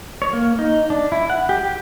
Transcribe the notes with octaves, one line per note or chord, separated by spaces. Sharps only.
C#5
A#3
D#4
D4
E4
F#5
G4
G4